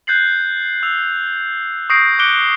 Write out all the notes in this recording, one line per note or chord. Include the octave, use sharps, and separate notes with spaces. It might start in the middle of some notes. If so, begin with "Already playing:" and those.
F#6 G6 A6 C7 F#7
E6 F7
C#6 D#6 G6 A#6 C7 D7
D6 F#6 C#7 D7 G7